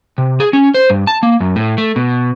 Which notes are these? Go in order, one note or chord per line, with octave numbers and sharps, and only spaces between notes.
C3
G#4
C#4
C5
G2
A5
A#3
F#2
A2
A3
B2